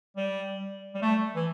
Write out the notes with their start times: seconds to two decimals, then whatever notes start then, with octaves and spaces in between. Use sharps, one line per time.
0.17 G3
0.94 G3
1.02 A3
1.35 E3